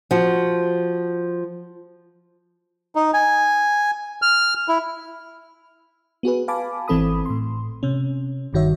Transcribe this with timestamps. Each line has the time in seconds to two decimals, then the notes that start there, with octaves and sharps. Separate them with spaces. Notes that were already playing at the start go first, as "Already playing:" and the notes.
0.11 F3 F#4
2.95 D#4
3.14 G#5
4.22 F6
4.68 E4
6.23 B3 F#4 G#4 B4
6.48 F5 G#5 A5 B5 D6
6.88 G#1 E3 C4 A4 B5 D#6
7.26 A2 C6
7.83 C3 C#4
8.53 G1 G2 D#3 F#4 C#5 E5